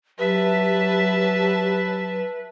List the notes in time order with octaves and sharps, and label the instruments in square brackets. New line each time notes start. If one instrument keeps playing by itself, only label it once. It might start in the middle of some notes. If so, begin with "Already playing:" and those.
[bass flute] F#3 [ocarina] G4 [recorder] B4 [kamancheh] E5 A5